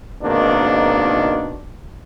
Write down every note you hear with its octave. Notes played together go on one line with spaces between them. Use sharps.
G#1 B2 D#3 A#3 D4